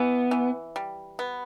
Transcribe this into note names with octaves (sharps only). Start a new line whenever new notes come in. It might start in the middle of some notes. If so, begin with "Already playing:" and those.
Already playing: E3 B3
E3
G3
B3